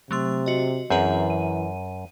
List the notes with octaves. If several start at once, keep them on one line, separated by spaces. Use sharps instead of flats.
C3 F#3 A3 C6
F#4 D#5
F#2 E3 C4 G#4 B4
D#7